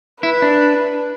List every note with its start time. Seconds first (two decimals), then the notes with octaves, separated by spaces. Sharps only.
0.23 E4 B4
0.42 D4